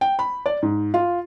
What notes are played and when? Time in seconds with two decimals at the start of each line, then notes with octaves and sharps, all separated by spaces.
0.01 G5
0.19 B5
0.46 D5
0.62 G#2
0.94 F4